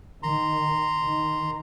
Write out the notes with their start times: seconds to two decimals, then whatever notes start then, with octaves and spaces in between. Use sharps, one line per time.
0.23 D#3 A#5 C6
1.01 D#3